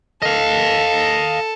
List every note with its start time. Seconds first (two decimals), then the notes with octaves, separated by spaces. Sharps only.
0.22 A4 D#5 F5